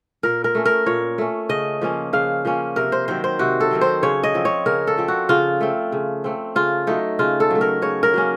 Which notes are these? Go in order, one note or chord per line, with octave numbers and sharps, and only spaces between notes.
A#2 A#4
A#4
A3 C#4
A#4
A#2 C#5
A3 C#4
C#3 D#5
F3 A#3 C#4
C#3 F5
F3 A#3 C#4
C3 A#4
C5
D#3 F#3 C4 C5
C5
C3 F#4
A4
D#3 F#3 C4
C5
C#3 C#5
D#5
F3 C4
C#5
C#3 A#4
A4
F3 C4
F#4
C#3 F4
A3 C4
C#3
A3 C4
C#3 F4
F#3 A3 D#4
C#3 F4
A4
F#3 A3
A#4
C#3 C#5
A#4
F#3 A#3 C#4